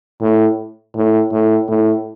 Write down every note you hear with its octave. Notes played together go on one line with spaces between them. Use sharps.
A2
A2
A2
A2